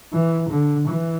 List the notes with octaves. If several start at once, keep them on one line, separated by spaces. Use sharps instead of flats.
E3
D3
E3